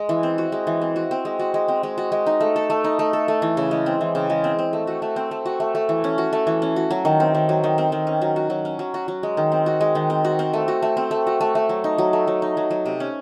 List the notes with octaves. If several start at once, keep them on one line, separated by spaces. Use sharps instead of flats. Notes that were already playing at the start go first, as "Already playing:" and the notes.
Already playing: G#3
E3
C4
F#4
G#3
E3
C4
F#4
C4
G#3
F#4
G#3
C4
G#3
F#4
G#3
D#4
A3
A4
A3
D#4
A3
A4
A3
E3
C#3
G#3
C4
E3
C#3
G#3
C4
C4
A3
F#4
A3
C4
A3
F#4
A3
A3
E3
C#4
F#4
A3
E3
C#4
F#4
F#3
D#3
C4
D#3
F#3
D#3
C4
D#3
C#4
F#3
F#4
F#3
C#4
F#3
F#4
F#3
G#3
D#3
C4
F#4
G#3
D#3
C4
F#4
C4
A3
F#4
A3
C4
A3
F#4
A3
A3
F#3
D#4
F#3
A3
F#3
D#4
F#3
F#3
C3
C#4